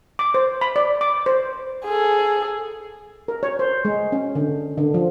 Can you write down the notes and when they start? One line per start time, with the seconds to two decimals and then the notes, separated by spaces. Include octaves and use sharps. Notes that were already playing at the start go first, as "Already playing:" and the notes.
0.19 D6
0.34 C5
0.61 B5
0.76 D5
1.01 D6
1.26 C5
1.85 G#4 A4
3.28 A#4
3.43 C#5
3.59 C5
3.85 G#3
4.12 C#4
4.35 D3
4.78 D3
4.94 F3